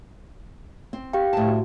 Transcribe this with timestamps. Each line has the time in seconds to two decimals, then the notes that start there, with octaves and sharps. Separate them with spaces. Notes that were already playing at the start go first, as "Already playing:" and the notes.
0.93 C4
1.13 G4 F5 G5
1.33 A2 A5
1.48 F#4